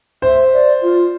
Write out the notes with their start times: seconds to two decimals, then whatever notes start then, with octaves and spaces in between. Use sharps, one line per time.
0.22 C5 E5
0.52 D5
0.81 F4